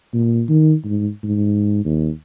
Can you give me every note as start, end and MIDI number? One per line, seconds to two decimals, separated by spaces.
0.14 0.43 46
0.49 0.74 51
0.84 1.09 44
1.23 1.84 44
1.85 2.10 39